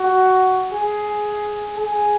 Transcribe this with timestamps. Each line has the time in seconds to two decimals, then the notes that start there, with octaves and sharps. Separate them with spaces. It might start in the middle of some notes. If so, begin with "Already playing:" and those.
Already playing: F#4
0.72 G#4
1.77 G#4